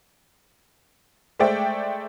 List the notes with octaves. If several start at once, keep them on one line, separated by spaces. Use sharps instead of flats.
G#3 A3 C5 D5 E5 G5